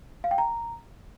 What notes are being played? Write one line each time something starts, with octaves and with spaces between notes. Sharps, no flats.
F5
G5
A#5